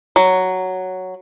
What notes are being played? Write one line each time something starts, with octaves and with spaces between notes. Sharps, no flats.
F#3